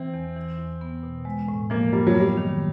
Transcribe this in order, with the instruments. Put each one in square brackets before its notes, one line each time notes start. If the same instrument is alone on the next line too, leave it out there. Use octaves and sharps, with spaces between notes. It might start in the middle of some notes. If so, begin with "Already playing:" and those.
Already playing: [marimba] E3 [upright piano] C4
[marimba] E2
E3
E2
B3
B2
G#3
A2
[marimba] F3 [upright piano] A#3
[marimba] F#2 [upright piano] G3
[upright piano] F#3
[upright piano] G3 [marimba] B3
[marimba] D#3